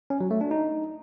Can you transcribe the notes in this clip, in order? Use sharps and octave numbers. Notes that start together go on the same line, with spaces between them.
C#4
F#3
A3
D4
D#4